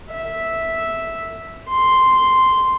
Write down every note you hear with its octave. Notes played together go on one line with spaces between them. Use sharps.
E5
C6